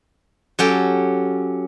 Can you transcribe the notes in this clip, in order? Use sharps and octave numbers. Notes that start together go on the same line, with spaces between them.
F#3 C#4 G4 A4 G5